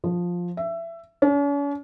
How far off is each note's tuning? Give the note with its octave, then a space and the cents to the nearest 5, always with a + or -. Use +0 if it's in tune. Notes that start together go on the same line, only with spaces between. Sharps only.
F3 +10
E5 +20
C#4 +45